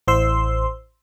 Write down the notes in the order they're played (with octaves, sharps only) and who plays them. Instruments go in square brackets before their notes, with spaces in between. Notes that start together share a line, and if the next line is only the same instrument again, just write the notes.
[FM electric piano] A1 C5 C6 E6